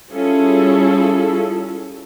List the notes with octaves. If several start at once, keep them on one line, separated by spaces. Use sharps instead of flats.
G3 C#4 E4 F4 G#4 A4